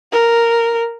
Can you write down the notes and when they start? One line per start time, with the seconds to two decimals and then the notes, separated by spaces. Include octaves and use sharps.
0.12 A#4